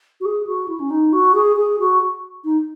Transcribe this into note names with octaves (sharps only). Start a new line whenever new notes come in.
F#4
G#4
F#4
E4
C#4
D#4
F#4
G#4
G#4
F#4
D#4